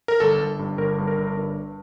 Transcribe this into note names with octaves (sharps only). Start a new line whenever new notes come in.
A#4
G1 A4
G1
G2
G1 A#4
G2
A#4
G1
G2